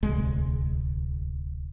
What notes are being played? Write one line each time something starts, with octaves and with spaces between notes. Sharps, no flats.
D1 G1 C2 G#3